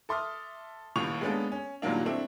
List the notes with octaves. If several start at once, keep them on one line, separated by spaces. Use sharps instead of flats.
A4 E5 C6 D6 D#6 F6
D#1 D#2 A2 C#6 F7
G#3 A#3 B3 C#4 D4 A4
C#4
G2 A#2 D#3 F#3 A#3 D4
A3 C4 D4 E4